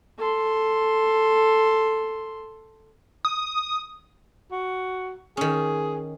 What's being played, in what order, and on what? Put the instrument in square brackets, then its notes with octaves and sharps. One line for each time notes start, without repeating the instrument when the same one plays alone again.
[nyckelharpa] A4 C6
[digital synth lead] D#6
[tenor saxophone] F#4
[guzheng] D#3 C#4 [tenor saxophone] G#4